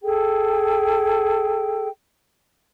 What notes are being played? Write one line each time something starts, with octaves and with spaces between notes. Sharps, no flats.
G#4 A4 G5